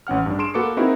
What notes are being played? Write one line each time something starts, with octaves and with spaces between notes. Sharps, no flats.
A1 C#4 F#5 F6
G2 D4
G#4 C6 D7 E7
A#3 F#4 A4 B4 D6 C#7
C4 D#4 E4 F#4 G#4 A#4